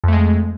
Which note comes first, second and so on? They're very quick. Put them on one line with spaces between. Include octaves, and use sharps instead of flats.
F2 A3 G#3